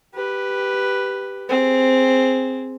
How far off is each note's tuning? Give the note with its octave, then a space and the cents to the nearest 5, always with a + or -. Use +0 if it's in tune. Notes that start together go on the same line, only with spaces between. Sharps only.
G4 +0 B4 +0
C4 -5 G#4 +0